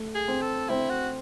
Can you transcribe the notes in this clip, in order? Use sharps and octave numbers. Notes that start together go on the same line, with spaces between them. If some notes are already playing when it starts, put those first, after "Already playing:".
Already playing: A3
G#4
C4
A4
C4 E4
F#4